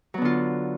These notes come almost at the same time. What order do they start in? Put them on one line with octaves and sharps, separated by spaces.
F#3 B3 D3 F4